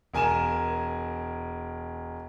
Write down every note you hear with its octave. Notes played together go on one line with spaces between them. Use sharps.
E1 A#4 G#5 A#5 E7